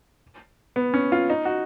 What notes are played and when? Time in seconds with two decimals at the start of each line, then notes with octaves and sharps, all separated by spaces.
0.76 B3
0.94 C#4
1.12 F4
1.30 D#4
1.45 F#4